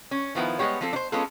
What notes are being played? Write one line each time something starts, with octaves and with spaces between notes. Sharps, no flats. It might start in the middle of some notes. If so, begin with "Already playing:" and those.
C#4
D#3 F3 B3 E4
G3 G#3 B3 G4 C#5
F3 C4 A4
D4 C5
G#3 B3 C#4 F4 G#4 A4